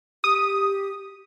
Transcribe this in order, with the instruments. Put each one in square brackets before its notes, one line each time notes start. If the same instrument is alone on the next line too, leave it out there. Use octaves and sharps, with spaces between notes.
[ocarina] G4 [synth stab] D#6